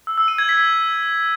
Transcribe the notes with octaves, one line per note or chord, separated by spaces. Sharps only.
E6
E6
D#7
G#6
B6